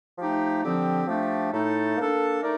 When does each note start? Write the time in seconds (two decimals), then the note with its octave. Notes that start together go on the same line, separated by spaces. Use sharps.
0.18 F3 A3 D#4 G4
0.63 D3 F3 C4 G4
1.07 F3 A3 D4 G4
1.52 A2 A3 D#4 A4
1.97 A#3 D4 A4
2.42 A3 D#4 A#4 D5